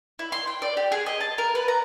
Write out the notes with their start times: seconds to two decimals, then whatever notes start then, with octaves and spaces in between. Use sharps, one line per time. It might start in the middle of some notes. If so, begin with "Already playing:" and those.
0.19 E4
0.32 C6
0.47 G5
0.62 D5
0.77 G4
0.92 G#4
1.06 D#5
1.20 A5
1.38 A#4
1.55 B4
1.68 A#5